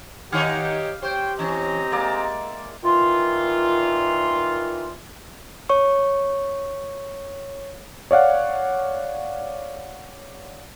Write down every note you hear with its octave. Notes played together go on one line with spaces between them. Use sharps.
D#3 D#4 G4 C#5 F5 F#5
G4 C5 C#5 G5
E3 C4 C#4 D#5 A#5
G#3 A#3 D5 E5
A#2 D#3 E3 D#4 F4
C#5 C#6
C#5 D5 F5 F#5